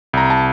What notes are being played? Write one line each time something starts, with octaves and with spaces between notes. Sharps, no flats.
C2 A#5
A5